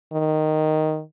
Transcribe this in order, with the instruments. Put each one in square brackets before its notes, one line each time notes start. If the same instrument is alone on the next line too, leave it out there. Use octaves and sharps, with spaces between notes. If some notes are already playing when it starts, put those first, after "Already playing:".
[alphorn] D#3